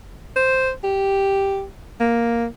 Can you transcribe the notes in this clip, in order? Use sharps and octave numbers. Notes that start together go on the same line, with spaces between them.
C5
G4
A#3